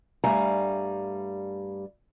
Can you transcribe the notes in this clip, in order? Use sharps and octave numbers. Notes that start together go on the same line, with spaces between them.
G2 G3 A3 F5 G#5 A#5